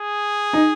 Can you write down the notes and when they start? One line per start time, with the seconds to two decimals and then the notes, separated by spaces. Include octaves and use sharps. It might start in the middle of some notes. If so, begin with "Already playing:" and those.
Already playing: G#4
0.53 D#4